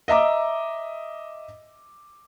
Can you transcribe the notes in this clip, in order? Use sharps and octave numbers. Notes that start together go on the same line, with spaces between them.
D#5 E5 A#5 D6